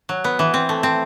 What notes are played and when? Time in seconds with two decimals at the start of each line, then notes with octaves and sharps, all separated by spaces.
0.09 F#3
0.24 B3
0.39 E3
0.54 C4
0.69 A3
0.83 C4